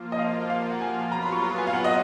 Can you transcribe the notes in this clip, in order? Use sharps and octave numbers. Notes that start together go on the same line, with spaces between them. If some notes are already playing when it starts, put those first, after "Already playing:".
Already playing: F3 A#3 F4
D#5
F5
F5
F#5
G#5
F#3 B3 F4 A#5
B5
C#6
A#5
G#5
F5
F#5
D#5